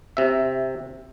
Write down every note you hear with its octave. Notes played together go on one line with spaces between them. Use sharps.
C3 E5